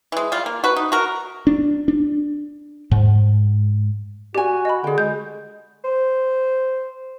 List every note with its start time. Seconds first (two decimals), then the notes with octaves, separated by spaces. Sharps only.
0.12 E3 G#3
0.32 G3 F4
0.46 A#3
0.64 F#4 B4
0.76 D#4
0.92 F#4 A#4
1.47 D4
1.88 D4
2.91 G#2
4.35 F#4 G4 D5 G#5
4.65 D#5 B5
4.84 D3 G#4 G5
4.98 G#3 G6
5.84 C5